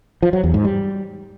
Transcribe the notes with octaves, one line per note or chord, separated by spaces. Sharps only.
F3
F#3
E2
G#2
G3